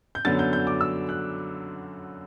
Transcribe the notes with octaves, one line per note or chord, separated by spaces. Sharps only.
G6
F#2 D3 F#3 B3 A6
G6
G6
D6
E6
F#6